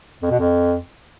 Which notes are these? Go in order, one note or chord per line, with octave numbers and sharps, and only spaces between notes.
F2
B2
F2